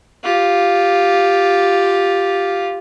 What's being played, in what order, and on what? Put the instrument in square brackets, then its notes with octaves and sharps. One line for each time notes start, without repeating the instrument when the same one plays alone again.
[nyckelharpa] F4 G4